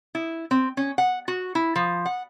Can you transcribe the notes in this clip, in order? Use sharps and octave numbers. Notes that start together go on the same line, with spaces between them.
E4
C4
C#4
F#5
F#4
E4
F3
F#5